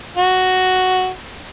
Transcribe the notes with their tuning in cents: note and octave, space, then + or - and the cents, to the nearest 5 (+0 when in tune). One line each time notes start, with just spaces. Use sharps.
F#4 +5